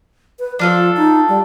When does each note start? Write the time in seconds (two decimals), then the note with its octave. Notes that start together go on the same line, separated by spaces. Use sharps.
0.39 B4
0.59 F3 D4 F4 A4
0.96 D#4
1.29 G3